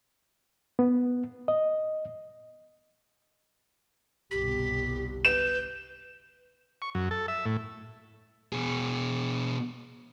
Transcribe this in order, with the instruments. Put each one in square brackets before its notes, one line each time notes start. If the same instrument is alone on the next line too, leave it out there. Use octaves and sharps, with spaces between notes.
[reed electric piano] B3
D#5
[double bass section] G1 C2 B2 [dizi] G4 [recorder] B6
[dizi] B4 [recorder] G6 [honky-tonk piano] E7
[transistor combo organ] C#6
F#2
A4
E5
A2
[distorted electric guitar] B2 G#4